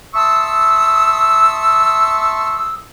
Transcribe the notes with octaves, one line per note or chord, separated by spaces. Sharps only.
E5 A5 C6 C#6 D#6 E6